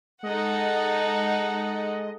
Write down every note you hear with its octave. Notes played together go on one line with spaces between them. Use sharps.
G#3 D#4 A4 D#5 F#5